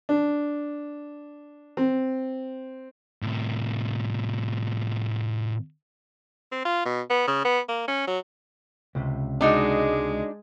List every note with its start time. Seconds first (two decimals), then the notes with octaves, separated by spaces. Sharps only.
0.09 D4
1.77 C4
3.22 A2 C3
6.52 C4
6.65 F4
6.86 B2
7.10 B3
7.28 C#3
7.45 B3
7.69 A#3
7.88 C#4
8.07 F#3
8.95 C#2 C3
9.41 G#3 D4 D#4 F#4